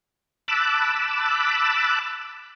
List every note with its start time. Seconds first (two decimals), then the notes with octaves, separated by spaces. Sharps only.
0.48 A5 B5 D6 E6 F#6